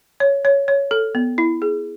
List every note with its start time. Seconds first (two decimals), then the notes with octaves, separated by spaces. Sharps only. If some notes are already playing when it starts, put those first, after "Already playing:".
0.20 C#5
0.45 C#5
0.68 C#5
0.91 A4
1.15 B3
1.38 E4
1.62 G#4